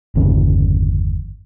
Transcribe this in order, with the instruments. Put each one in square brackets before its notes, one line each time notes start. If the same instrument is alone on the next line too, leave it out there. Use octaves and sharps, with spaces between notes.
[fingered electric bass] G1 E2 C#3